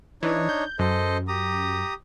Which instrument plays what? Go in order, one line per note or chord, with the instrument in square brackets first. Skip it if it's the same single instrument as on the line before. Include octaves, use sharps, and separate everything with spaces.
[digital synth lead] E3 [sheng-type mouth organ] D4 D#4 C#5
[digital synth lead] G6
[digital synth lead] F#2 [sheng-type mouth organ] A4 C5 D#5
[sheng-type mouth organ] G4 A#5 D#6